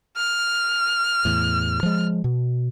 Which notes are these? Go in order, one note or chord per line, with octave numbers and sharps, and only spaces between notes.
F6
E2 A2
F3 G#3
B2